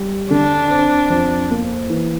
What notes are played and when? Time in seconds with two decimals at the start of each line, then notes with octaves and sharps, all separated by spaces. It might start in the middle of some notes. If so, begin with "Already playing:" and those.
Already playing: G3
0.31 D3 D4
0.70 C4
1.10 F2
1.51 A#3
1.90 E3